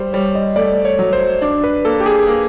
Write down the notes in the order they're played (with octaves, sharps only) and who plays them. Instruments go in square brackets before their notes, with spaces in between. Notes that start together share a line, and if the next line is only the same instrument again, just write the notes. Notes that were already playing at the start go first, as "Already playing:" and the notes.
Already playing: [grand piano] G3 [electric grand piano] C5
[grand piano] G3 [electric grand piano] C#5
[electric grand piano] D#5
[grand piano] A3 [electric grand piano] D5
[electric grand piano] C#5
[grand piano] F#3
[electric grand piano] C5
[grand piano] D4
[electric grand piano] B4
[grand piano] A#3 [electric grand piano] A4
[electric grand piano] G4
G#4
[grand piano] A#3